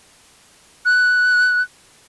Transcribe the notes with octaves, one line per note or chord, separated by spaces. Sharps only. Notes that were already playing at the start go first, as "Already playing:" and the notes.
F#6